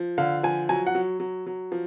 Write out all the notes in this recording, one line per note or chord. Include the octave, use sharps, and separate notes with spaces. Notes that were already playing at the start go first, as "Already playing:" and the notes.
Already playing: F3
D3 F5
F3 G#5
F#3 G#5
F#5
F#3
F#3
F#3
F3